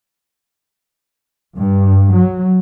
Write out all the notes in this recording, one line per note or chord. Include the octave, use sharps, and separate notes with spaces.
G2
F#3